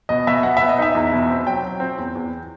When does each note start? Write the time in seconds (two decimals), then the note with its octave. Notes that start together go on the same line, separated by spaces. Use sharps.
0.09 B2 D#5
0.27 B2 E5
0.43 B3 F#5
0.57 B3 E5
0.69 D#5
0.78 D#4 E5
0.95 E2
1.12 B2
1.30 C4
1.47 F#3 G5
1.63 F#3
1.80 C4
1.98 E2
2.15 E2